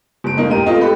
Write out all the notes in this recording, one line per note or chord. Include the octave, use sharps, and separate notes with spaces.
F#1 D7
A2 E3 A#3 D#4
E1 G#2 D#4 G4 A#4 D#7
G#3 A3 B3 C4 F4 D#5
G4 A4 B5 F#6